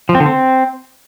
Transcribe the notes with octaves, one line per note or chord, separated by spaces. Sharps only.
F3
C4
D3
C4